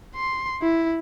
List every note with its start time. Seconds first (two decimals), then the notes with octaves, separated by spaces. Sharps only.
0.15 C6
0.62 E4